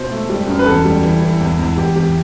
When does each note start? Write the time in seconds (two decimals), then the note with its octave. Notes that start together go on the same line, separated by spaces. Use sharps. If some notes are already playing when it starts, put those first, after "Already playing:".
Already playing: B2 C5
0.11 A3
0.29 G3
0.47 F#2
0.59 B4
0.66 E2 A4
0.85 G3
1.03 E3
1.22 E3
1.41 E2
1.59 E2
1.77 E2 G4
1.96 E2 G4